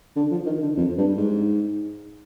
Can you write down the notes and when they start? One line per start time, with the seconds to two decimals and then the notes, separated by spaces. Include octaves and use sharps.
0.16 D3
0.31 F3
0.46 D#3
0.62 D3
0.77 F2
0.98 G2
1.17 G#2